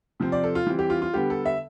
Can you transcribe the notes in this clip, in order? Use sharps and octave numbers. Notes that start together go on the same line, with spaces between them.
C3 F3 C4
D5
A4
F4
E3 G3 C4
G4
F4
F4
D3 G3 B3 G4
A4
E5